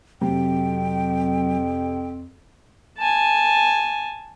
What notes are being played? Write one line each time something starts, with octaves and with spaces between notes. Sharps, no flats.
F2 C3 F#3 G5
G#5 A5